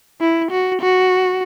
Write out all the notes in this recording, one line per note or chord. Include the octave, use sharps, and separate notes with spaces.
E4
F#4
F#4